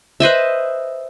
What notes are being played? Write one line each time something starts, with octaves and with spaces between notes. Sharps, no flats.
B4 C5 D#5 E5